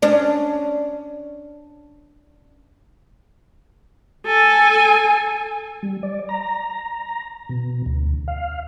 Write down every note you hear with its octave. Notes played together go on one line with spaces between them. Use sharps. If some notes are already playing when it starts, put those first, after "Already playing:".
C#4 D4
A4 G#5
G3
D5
A#5
B2
D2
F5